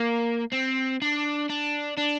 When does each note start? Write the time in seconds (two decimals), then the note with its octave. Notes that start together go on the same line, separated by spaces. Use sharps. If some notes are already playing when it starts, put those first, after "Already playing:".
Already playing: A#3
0.53 C4
1.02 D4
1.49 D4
1.98 D4